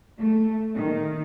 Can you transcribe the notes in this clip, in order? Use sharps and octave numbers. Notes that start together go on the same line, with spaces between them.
A3
D#3